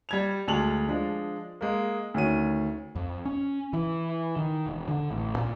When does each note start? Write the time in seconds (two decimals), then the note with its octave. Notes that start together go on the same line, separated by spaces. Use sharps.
0.09 G3 G#6 F7
0.48 D2 G#3 A5 F7 F#7
0.89 F3 G#3 D4
1.61 G#3 A#3
2.14 D2 D#3 C#4 D#7
2.96 F2
3.25 C#4
3.73 E3
4.37 D#3
4.67 E1
4.88 D3
5.11 A1
5.36 A#2